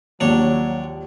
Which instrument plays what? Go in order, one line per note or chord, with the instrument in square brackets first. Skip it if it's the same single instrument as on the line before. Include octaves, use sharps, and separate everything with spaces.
[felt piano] A#1 D#2 [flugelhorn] F#3 [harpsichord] D4 C#5